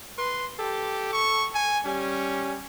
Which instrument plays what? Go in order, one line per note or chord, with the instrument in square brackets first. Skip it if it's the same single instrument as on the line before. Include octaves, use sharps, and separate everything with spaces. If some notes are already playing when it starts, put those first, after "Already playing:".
[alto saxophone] B4 [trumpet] C6
[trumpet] G4 [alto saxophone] A4
[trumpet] C#6
G#5
[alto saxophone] G3 [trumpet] C#4